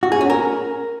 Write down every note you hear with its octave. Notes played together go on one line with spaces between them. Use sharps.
F#4
G#4
C#4
A#4